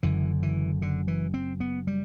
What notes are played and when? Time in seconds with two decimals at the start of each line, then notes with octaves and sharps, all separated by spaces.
0.03 F#1 F#2 D3 E3
0.43 E3
0.82 D3
1.08 E3
1.34 C4
1.60 B3
1.87 G3